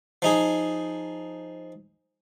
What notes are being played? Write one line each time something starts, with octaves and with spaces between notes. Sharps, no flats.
F3 D#4 G#4